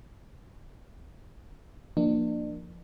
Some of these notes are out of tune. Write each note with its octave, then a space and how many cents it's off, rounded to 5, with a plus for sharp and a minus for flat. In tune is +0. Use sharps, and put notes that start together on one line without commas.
F3 -10 A#3 +0 D4 +35